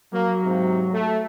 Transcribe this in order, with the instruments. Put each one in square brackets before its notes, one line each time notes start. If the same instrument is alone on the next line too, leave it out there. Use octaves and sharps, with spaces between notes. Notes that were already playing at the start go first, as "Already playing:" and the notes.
[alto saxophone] F#3 [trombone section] A#3
[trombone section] G#2 C3
A3